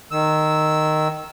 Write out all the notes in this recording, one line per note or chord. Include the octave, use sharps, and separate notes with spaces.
D#3 E6